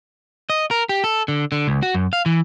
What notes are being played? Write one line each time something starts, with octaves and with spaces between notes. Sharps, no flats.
D#5
A#4
G4
A4
D3
D3
C#2
F#4
F#2
F5
E3